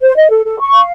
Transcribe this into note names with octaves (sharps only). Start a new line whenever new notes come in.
C5
D#5
A4
A4
C#6
F5